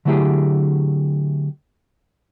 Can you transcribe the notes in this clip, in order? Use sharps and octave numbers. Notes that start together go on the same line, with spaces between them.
D3 F#3 A3 E4 G4 G#4